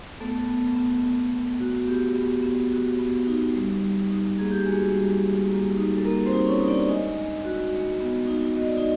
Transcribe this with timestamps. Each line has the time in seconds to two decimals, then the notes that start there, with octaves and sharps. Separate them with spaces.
0.20 A3 B3 A4
0.48 B3
0.76 B3
1.05 B3
1.32 B3
1.60 F#4
1.88 B3 G4
2.15 B3
2.43 B3
2.71 F#4
2.99 B3
3.27 D#4
3.54 G3
3.82 G3
4.10 D#4
4.38 A#3 G#4
4.52 G4
4.66 G#3 F#4 G#4
4.94 G3
5.22 G3
5.50 A#3
5.77 D#4
5.97 A4
6.05 A#3 D#4 A#4
6.26 C4 C5
6.33 D#4
6.47 C#4 C#5
6.61 D#4
6.68 D4 D5
6.89 G#3 D#4 D#5
7.17 G#3
7.45 F#4
7.72 G#3
8.00 B3
8.27 D#4
8.56 F#4 D#5
8.67 D5
8.78 D#4 D#5